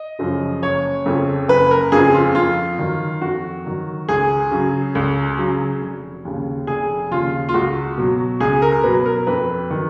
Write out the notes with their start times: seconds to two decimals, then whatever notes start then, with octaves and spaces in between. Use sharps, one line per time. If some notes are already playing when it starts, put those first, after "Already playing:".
Already playing: D#5
0.19 F#2 C#3 F3
0.62 F#1 C#5
1.06 F2 C#3 F3
1.48 F#1 B4
1.71 A#4
1.92 F2 C#3 F3 G#4
2.14 F4
2.35 F2 F4
2.79 D#3 F#3
3.21 F2 F#4
3.65 D#3 F#3
4.09 C#2 G#4
4.51 C#3 F#3
4.95 C#2
5.38 C#3 F#3
5.81 F1
6.25 D#2 C#3
6.67 F1 G#4
7.11 D#2 C#3 F4
7.49 F4
7.54 C#2 F#4
7.98 B2 F#3
8.40 C#2 G#4
8.62 A#4
8.83 B2 F#3 B4
9.06 A#4
9.27 F2 B4
9.71 D#3 F#3